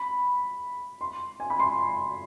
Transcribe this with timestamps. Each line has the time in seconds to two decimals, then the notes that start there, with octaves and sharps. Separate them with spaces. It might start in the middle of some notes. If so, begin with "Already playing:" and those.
Already playing: B5
1.01 C6
1.40 G#5
1.50 B5
1.60 C6